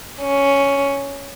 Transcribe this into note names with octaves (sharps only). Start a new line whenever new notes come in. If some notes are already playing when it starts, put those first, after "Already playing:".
C#4